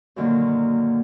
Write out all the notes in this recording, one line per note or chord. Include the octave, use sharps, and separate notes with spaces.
F#2 A#2 D3 D#3 F#3 A#3